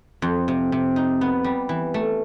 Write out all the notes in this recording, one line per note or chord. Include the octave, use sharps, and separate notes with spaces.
F2
C3
C3
D#4
B3
G3
E3
A3